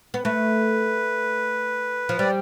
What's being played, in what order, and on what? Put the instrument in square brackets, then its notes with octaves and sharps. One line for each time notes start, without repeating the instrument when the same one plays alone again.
[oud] B3
[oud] A3 [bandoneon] B4
[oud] F3
[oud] G3 [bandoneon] D5